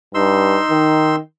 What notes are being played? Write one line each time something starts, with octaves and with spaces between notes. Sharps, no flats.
G2 D#4 C6 E6
D#3